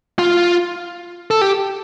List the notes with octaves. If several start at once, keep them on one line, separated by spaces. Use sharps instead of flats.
F4
A4
G4